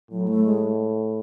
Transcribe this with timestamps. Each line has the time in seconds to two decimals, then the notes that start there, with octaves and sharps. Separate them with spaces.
0.11 A2 F#3
0.28 A3
0.45 G#3